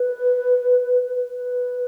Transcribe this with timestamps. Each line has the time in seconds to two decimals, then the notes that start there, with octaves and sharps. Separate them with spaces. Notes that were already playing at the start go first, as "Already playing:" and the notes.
Already playing: B4
1.27 B4